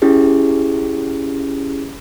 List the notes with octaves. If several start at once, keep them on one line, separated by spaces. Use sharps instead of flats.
C#4 E4 G4 G#4